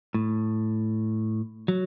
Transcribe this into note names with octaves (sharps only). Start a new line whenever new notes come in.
A2
F#3